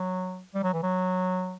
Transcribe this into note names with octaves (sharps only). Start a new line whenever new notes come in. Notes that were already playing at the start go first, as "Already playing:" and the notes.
Already playing: F#3
G3
F#3
E3
F#3